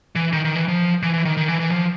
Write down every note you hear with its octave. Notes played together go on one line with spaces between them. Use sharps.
E3
D#3
D#3
E3
F3
E3
E3
D#3
D#3
E3
E3
F3